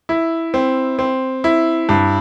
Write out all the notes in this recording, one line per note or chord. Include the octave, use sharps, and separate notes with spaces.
E4
C4
C4
E4
G2